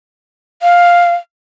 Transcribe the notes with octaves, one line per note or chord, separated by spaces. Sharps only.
F5